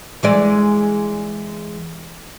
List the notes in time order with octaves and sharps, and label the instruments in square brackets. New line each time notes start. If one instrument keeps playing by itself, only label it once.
[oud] E3 G#3 D5